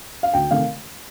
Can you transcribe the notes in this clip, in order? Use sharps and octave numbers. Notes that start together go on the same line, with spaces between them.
F5
D2 G5
C3 D#3 A3 F5